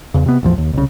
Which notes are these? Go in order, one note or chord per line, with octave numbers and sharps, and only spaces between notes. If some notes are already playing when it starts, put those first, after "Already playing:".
E2 C#3
C3 B3
A1 E2 F3
D#2
C2 C#3